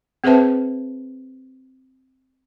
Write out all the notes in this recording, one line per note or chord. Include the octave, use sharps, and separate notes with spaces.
C4 G#4 B4 C5 E5 A5